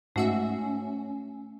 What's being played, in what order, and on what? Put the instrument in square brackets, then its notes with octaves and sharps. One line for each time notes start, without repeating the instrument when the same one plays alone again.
[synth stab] G#2 F#4 E5 [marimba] A3 [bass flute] C#4